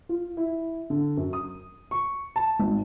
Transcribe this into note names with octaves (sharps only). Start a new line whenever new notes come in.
F4
E4
D3
F#2
D#6
C#6
A5
G#1